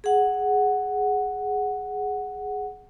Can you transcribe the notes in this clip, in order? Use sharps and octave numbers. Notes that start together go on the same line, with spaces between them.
G#4 F#5